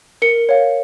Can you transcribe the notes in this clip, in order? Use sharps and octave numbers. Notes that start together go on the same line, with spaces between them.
A#4 C#7
C#5 F5